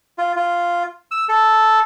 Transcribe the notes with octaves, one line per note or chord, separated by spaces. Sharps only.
F4
F4
E6
A4